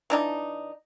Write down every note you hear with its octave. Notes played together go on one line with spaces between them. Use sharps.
E3 D4 D#4